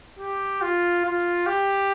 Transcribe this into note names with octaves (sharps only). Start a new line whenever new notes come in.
G4
F4
F4
G4